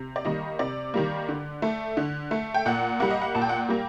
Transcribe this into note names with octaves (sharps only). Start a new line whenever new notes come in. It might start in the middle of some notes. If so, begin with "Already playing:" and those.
Already playing: C3
D5
D#3 G3 A#3 D#5
C3 D5
D#3 G3 A#3
D3
A3
D3
A3
G5
A#2 F#5
G3 A#3 F#5
D#5
F#5
A#2 A5
G5
F#5
G5
G3 A#3